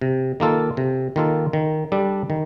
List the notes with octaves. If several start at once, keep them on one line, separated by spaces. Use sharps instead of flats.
C3
D#3 A#3 F4 A4
C3
D#3 A#3 F4 A4
D#3
G3 D4 A4
D#3